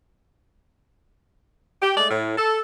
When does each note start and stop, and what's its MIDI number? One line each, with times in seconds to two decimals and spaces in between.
1.81 1.94 67
1.97 2.08 56
1.97 2.08 57
1.97 2.08 74
2.10 2.33 45
2.37 2.59 69